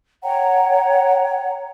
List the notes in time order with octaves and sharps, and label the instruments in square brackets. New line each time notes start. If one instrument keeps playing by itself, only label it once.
[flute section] C#5 F#5 G5 A#5